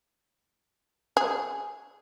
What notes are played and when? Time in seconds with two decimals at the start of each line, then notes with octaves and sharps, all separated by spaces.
1.17 G#4